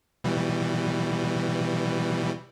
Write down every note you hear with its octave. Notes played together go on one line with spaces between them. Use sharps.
B2 E3 G3